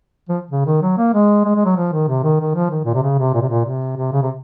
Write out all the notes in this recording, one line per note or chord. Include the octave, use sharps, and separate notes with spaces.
F3
C#3
D#3
F#3
A#3
G#3
G#3
G#3
F#3
F3
D#3
C3
D#3
D#3
F3
D#3
A#2
C3
C#3
C3
A#2
C3
A#2
C3
C3
C#3
C3